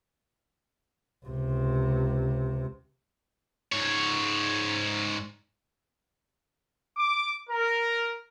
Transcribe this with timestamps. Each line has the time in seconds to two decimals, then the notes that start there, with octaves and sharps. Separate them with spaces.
1.26 C#2 C3
3.72 G#2 C#5
6.97 D6
7.50 A#4